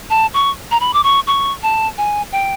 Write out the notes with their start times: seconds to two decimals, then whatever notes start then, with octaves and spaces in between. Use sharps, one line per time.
0.10 A5
0.34 C#6
0.71 A#5
0.80 B5
0.94 D6
1.04 C#6
1.27 C#6
1.63 A5
1.98 G#5
2.32 G5